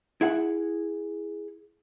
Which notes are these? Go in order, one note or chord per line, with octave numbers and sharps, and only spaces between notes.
E4 G#4 F#5